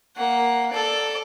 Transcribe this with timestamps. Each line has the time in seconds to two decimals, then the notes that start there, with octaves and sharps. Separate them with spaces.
0.17 A#3 F#5
0.71 A4 D5